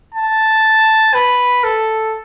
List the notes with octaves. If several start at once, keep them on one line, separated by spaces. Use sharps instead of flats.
A5
B4
A4